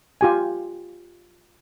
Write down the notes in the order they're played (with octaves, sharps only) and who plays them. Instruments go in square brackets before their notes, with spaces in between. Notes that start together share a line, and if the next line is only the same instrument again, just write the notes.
[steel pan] F4 G4 G#5